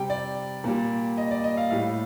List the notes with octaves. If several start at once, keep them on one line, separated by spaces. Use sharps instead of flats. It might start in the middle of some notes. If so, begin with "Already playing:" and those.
Already playing: C3 G3 G5
D5
A#2 G3
D#5
D5
D#5
F5
A2 G3 F5